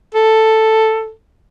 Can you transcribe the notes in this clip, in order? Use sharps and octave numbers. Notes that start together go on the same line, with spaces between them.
A4